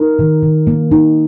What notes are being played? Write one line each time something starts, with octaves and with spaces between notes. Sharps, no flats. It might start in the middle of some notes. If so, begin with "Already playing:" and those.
Already playing: D#4 A#4
D#3
D#3
A#3
D#4